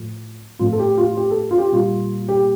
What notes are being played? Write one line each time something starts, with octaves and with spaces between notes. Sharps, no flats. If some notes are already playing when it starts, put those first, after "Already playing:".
Already playing: A2 F3 A3
A2 F3 A3 F4
A4
G4
F4
G4
A4
F4
G4
A#2 G3 A#3 F4
G4